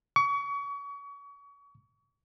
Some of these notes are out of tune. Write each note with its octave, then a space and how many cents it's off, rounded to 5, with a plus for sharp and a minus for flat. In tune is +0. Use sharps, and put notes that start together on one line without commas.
C#6 +35